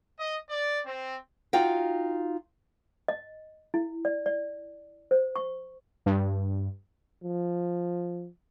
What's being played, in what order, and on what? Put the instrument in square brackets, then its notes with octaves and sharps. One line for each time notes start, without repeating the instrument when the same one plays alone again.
[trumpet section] D#5
D5
C4
[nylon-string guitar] D#4 F4 F#4 F5 G5
[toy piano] D#5
E4
D5
D5
C5
C#6
[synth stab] G2
[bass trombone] F3